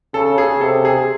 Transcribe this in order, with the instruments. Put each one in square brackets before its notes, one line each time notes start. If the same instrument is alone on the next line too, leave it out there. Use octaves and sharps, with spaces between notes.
[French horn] C#3 [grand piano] A4
[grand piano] G#4
[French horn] C3 [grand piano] A4
[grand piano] G#4